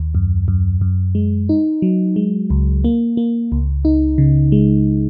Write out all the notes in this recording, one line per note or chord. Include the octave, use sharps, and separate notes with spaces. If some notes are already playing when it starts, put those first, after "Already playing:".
Already playing: D#2
F#2
F#2
F#2
G#3
D#4
F#3
G#3
C#2
A#3
A#3
C#2
D#4
C#3
G#3